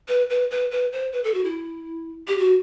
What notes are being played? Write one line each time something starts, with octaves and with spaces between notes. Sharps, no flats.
B4
B4
B4
B4
C5
B4
A4
F#4
E4
G4
F#4